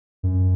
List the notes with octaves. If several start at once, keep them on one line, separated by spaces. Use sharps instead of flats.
F#2